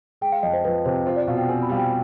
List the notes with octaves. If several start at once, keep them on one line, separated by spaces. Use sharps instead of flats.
G#3 G5
F5
F2 D#5
C5
F3 B4
C3 C5
F4 C5
D5
B2 F5
G5
C4 G#5
B5
G3 F5
G5